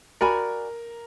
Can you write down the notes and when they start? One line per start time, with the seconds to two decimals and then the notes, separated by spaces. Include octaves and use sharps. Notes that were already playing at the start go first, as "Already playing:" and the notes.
0.21 F#4 A#4 D5 G#5 B5